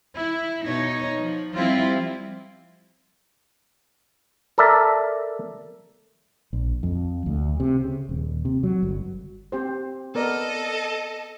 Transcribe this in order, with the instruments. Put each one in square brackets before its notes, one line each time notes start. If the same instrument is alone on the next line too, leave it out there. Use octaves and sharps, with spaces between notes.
[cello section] E4
B2 D#4 C#5
F3
F3 G3 C4 E4 F4
[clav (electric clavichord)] A4 A#4 D5 E5
[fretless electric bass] A#1
F2
D2
C3
C#3
D#1
C3
F#3
G1
[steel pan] C4 G4 C5
[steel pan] B3 A#4 D5 [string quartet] A4 D#5